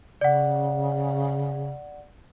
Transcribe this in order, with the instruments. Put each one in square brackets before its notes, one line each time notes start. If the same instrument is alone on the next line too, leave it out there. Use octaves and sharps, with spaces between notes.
[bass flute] C#3 [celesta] D5 F#5